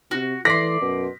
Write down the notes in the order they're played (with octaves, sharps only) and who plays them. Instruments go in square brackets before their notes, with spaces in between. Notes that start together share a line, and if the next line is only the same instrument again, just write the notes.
[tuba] C3 [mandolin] F#4
[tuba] E3 [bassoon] A3 [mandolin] D5 C6 [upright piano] A#6 B6
[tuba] F#2 [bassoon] B2